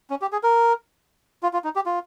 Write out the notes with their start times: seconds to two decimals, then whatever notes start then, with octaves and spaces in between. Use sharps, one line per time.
0.10 C#4
0.22 G4
0.32 G#4
0.43 A#4
1.43 F4
1.53 F4
1.64 D#4
1.76 G4
1.86 F4